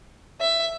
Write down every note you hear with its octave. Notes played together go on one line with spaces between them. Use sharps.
E5